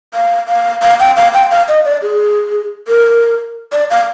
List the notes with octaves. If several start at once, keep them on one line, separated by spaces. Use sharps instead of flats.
F5
F5
F5
G5
F5
G5
F5
D#5
D5
G#4
A#4
D5
F5